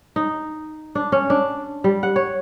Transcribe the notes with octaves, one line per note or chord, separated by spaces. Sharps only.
D#4
D4
C#4
D4
G3
F#5
C#5